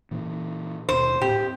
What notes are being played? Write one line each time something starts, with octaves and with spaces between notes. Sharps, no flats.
A#2 E3
D#2 B2 C5
A2 C4 G4